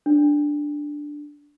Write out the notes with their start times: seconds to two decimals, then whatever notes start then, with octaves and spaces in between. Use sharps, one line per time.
0.06 D4